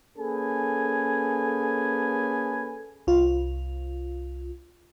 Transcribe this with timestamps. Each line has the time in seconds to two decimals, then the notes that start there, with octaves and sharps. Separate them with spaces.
0.16 A#3 C#4 G#4 A4 B4 G#5
3.07 C2 F4